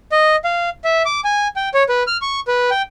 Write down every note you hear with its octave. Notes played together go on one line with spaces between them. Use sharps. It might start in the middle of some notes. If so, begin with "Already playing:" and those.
D#5
F5
E5
D6
G#5
G5
C#5
B4
F6
C#6
B4
G5